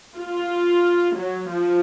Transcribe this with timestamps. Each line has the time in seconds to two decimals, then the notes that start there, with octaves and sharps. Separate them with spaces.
0.17 F4
1.18 F#3
1.51 F3